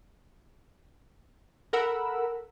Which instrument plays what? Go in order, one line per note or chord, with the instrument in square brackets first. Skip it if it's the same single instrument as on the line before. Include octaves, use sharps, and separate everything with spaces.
[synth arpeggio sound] A4 A#4 F#5 B5 E6